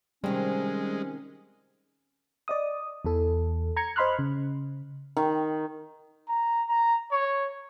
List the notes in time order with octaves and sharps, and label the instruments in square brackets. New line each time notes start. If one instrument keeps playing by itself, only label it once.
[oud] C3 D#3 C4 [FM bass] G3 [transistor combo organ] G#3 [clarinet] C#4
[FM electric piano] D5 D#5 D#6
E2 E3 A4
A#5 G#6 C#7
C5 D#5 B5 C6 F6 F#6
C#3
[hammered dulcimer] D#3
[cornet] A#5
A#5
C#5